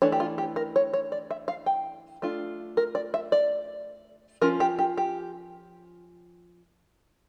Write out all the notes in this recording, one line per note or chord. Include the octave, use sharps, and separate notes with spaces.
E3 A3 D4 C#5
G4
F4
G4
A#4
C#5
C#5
D5
E5
F5
G5
A3 D4 F4
A#4
D5
E5
D5
F3 C#4 F4 A#4
G4
G4
G4